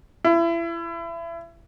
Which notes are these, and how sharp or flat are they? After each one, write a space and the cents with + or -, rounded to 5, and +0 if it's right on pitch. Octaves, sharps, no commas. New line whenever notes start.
E4 +30